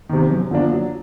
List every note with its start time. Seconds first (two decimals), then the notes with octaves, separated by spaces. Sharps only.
0.09 C3 D#3
0.31 F#2
0.51 D3 F3 A#3 D4
0.72 F#3